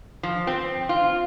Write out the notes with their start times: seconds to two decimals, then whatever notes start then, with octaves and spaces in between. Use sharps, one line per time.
0.23 F3
0.47 C4
0.89 F4